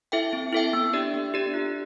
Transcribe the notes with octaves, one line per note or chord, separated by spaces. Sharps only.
E4 A4 E5 G5
C4
E4 A4 E5 G5
B3
D4 G4 D5
B3
D4 G4 D5
F4